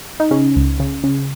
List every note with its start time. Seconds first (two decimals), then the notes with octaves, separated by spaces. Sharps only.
0.20 D#4
0.31 C#3 C#4
0.56 C#2
0.80 C#3
1.04 C#3